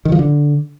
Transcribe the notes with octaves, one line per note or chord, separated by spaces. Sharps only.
D#3
F3
D3